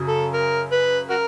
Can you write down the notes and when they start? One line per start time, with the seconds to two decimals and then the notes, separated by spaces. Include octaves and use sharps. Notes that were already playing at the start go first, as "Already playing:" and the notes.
Already playing: F#2 C#3 F#3
0.08 A4
0.34 A#4
0.72 B4
1.10 F#4 A#4